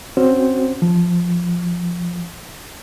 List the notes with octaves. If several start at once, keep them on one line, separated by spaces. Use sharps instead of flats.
C4 C#4 F#4 C5
F3